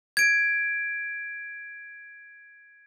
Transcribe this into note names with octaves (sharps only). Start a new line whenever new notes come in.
G#6 D7